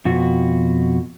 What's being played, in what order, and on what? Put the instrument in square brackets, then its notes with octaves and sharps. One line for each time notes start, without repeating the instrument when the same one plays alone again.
[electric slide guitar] F2 B2 F#4